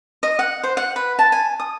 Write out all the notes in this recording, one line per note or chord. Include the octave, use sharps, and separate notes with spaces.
D#5
F#5
C5
F#5
B4
A5
G#5
D#6